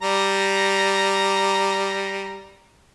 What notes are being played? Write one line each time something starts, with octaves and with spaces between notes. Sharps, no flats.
G3 A#5